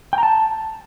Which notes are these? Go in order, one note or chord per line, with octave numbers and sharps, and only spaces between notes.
G5
A#5
A5